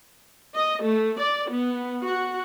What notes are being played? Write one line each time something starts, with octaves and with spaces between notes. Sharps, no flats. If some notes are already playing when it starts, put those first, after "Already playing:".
D#5
A3
D5
B3
F#4